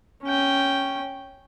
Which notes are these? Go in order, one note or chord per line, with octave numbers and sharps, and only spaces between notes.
C#4 G5